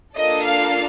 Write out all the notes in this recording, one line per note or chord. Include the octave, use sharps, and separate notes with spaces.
A#3 D4 F4 A4 D#5
F5